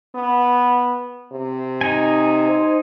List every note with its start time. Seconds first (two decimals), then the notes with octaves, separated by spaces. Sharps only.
0.15 B3
1.32 C3
1.81 D#4 G#5
2.51 C5